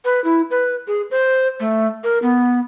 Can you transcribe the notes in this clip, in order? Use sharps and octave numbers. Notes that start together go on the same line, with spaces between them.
B4
E4
B4
G#4
C5
A3
A#4
B3